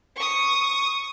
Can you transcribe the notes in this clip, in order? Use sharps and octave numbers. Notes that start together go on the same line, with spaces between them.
C#6 D#6